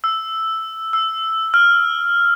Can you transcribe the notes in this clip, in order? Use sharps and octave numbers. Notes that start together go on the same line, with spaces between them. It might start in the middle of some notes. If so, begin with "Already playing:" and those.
E6
E6
F6